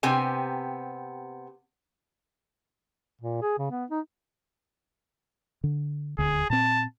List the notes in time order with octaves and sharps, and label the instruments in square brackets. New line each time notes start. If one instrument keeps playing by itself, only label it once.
[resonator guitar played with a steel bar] C3 B3 C4 G4 G#5
[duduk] A#2
G#4
C#3
B3
D#4
[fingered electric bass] D3
[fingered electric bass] D#1 D2 D3 [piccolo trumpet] G#4
[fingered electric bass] A#2 C4 [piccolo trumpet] A5